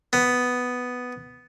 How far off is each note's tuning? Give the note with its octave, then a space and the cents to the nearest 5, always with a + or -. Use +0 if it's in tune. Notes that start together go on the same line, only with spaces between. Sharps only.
B3 +5